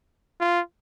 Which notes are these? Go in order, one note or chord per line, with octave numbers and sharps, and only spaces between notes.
F4